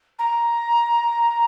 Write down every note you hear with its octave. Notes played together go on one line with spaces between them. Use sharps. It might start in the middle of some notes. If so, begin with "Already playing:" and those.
A#5